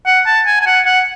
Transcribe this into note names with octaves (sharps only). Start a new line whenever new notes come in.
F#5
A5
G#5
G#5
F#5
F#5